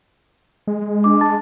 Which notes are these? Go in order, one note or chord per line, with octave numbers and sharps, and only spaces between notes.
G#3
D4 D6
A5 A6